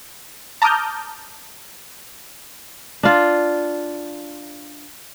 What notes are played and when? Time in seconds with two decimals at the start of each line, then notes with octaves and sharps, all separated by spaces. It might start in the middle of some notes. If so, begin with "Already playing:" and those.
0.62 A5 A#5 D6 D#6 F6 G6
3.03 D4 F4